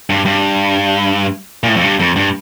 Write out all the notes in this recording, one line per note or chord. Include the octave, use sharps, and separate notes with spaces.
G2
G2
A#2
A2
F2
G2
F2
G2